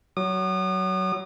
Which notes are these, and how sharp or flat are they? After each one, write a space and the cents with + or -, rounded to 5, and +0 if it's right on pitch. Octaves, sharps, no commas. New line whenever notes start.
F#3 +20 D#6 -35